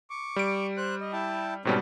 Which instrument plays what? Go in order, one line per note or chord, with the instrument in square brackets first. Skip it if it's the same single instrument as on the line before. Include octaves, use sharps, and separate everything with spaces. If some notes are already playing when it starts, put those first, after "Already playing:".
[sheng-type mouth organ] C#6 D6
[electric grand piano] G3 D7
[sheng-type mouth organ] C5 F#6
D#5
E4 G5 A5
[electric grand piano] G#2 B2 G3 [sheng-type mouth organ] C4 C#4 A4